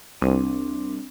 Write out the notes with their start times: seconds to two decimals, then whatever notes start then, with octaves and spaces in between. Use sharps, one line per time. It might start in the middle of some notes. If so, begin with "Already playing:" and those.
0.21 C2 C4 D4